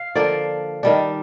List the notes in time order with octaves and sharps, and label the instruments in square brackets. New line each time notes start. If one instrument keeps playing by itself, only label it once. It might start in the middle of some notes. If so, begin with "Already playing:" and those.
Already playing: [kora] F5
D3 F3 A#3 D4 D5
D#3 G3 D4